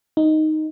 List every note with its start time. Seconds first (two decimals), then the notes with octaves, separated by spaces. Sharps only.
0.17 D#4